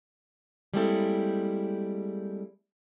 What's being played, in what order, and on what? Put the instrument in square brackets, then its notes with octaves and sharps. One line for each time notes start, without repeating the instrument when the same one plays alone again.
[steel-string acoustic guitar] G3 G#3 A#3 C4 E4 A4